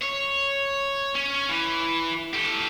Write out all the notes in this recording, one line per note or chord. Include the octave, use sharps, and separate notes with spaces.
C#5
C#4
E3
G4 A4